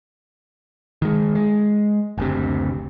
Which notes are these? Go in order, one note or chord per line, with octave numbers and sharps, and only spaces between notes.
D#3 G#3
G#3
F#1 D2 C3